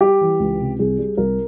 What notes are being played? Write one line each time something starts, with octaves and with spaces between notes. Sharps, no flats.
G3 G4
E3
C#2
C3
C2 G#4
G3
C2 A#4